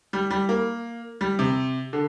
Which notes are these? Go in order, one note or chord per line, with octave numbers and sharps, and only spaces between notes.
G3
G3
A#3
G3
C3
D3